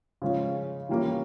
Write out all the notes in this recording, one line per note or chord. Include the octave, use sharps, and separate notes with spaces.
C#3 F3 G#3 C#4 F4
E3 G3 A#3 C#4 F4